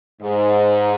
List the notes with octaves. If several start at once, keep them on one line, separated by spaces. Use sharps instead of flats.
G#2